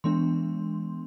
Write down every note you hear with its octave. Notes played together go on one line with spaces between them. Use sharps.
E3 G#3 B3 D4 C6